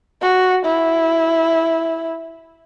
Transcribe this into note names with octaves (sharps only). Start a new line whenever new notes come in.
F#4
E4